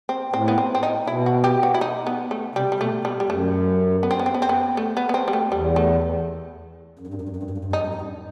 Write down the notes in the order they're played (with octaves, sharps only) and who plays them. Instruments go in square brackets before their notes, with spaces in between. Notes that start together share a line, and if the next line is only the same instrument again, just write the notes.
[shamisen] C4
[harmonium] A2 [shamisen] C4
[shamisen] B3
C4
C4
D#4
[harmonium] B2 [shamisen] E4
[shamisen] F#4
G4
F#4
E4
D#4
B3
A3
[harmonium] C3 [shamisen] G3
[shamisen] G3
[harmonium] B2 [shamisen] A3
[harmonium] B2 [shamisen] G3
[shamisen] G3
[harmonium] F#2 [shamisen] A3
[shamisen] B3
C4
B3
C4
B3
C4
B3
A3
B3
B3
C4
G3
A3
[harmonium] E2 [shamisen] G3
[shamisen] A3
[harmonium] F#2
G2
F#2
G2
F#2
G2
F#2
G2
F#2
G2
[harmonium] F#2 [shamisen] D#4
[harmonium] G2
F#2
G2
F#2